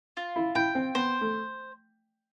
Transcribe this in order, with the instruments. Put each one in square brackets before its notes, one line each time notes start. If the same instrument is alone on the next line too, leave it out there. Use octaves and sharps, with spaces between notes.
[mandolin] F4
[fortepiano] E4
[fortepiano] E4 [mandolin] G5
[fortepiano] C4
[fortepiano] B3 [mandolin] C5
[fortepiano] A3